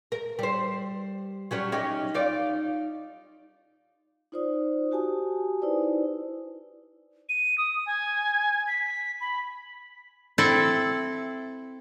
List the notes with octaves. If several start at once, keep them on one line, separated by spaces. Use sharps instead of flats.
A#4
G3 C5
F#3 G3 C#4
C#4 D#4 G4
D#4 F4 D5
D#4 F4 C5 D5 D#6
F#4 G4 G#5 A5 D#6
D#4 E4 B4 C5 D5
D#7
D#6
G#5
B6
B5
C4 E4 A4 E5